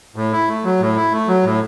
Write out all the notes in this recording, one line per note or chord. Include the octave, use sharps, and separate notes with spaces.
A2
E4
A3
F#3
A2
E4
A3
F#3
A2